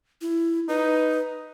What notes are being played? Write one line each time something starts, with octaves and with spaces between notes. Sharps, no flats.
E4
D#4 B4